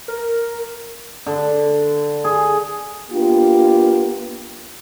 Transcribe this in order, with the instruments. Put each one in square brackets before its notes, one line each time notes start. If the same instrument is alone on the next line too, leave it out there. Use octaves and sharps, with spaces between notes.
[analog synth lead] A#4
[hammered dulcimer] D3
G#4
[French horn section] A#3 B3 D4 F4 G4